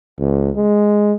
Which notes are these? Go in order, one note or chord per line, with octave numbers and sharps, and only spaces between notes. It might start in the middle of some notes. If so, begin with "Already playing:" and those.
C#2
G#3